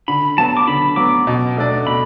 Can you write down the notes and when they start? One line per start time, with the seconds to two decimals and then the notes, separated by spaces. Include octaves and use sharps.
0.08 D3 B5
0.37 F#3 B3 A5
0.57 D6
0.67 D3 B5
0.96 F#3 B3 D6
1.27 B2
1.56 A3 D4 A4 D5
1.86 B2 B5